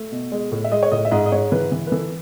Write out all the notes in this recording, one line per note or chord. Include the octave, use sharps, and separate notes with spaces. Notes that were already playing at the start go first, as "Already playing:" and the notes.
Already playing: A3
B2
G#3
A2
E5
G#3 D#5
C#5
A2 D#5
E5
G#2 D#5
D#5
G#2 C#5
E3 B4
E3
B4
E3 A4